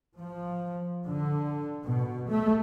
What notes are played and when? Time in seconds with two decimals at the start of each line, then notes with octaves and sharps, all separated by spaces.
0.18 F3
1.06 D3
1.85 B2
2.31 A3